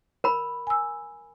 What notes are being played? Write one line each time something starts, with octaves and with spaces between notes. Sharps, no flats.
A#4 B5
G#5 E6